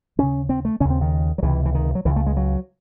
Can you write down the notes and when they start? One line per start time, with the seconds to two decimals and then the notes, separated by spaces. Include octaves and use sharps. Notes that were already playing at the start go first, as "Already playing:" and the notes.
0.18 D#2 C#3 C#4
0.49 C4
0.65 A3
0.80 D#2 C#3 C#4
0.90 C4
1.01 D#3
1.38 F#3
1.42 C#2 C3 E3
1.65 E3
1.75 D#3
1.95 F#3
2.05 C#2 C#3 E3
2.16 A3
2.26 G#3
2.37 F#3